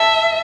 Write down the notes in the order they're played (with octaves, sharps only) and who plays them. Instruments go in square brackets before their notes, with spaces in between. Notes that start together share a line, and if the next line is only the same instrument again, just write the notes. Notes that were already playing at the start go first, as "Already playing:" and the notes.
Already playing: [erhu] E5 [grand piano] A5